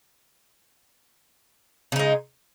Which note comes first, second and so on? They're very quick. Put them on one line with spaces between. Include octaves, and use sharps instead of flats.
C#3 D#4 G#3